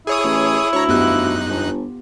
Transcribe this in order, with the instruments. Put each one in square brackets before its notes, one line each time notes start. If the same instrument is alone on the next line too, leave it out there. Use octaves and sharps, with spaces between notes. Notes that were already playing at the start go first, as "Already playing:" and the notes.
[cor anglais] E4 [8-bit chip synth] G#4 C#5 D#6
[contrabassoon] A1
[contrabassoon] D2 [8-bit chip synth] C#5 A#5
[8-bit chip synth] F#2 D#4 F#6 [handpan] B3 F4 G4
[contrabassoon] G1